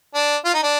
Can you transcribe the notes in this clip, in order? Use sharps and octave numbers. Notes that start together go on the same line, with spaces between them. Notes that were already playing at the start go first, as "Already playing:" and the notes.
D4
F4
D#4
D4